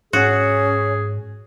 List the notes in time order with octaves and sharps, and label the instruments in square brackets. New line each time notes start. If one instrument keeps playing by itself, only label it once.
[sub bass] G#2 [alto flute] C#4 [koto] F#4 [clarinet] G#4